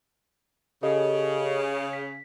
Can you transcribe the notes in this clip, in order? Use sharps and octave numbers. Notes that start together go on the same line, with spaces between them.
C#3 G4 A4 D#5
B6